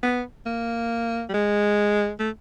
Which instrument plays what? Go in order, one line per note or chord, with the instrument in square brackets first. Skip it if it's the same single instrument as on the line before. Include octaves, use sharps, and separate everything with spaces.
[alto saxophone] B3
A#3
G3
G#3
A3